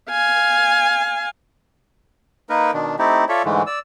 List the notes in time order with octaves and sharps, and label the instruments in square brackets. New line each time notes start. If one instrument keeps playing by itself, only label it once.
[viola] F5 G#5
[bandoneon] A#3 D#4 A#4 B4
B2 D#3 D4
A3 C4 D#4 E4 G4
F4 A4 C#5 D5 E5
G#2 D3 E3 G#3 A3
D5 E6